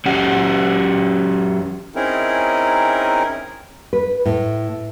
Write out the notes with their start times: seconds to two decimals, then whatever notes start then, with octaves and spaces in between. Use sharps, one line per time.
0.06 F#3 C#4 G4 F#5
1.95 C4 C#4 D#4 E4 G#4 A#4
3.93 B4
4.25 A2